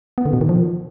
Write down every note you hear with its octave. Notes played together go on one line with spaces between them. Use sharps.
B3
D3
B2
D#3
F3